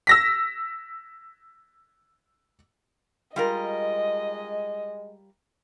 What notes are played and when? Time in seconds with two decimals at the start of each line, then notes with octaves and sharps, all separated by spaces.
0.07 E6 A#6 B6
3.36 G3 G#3 F4 A#4 D#5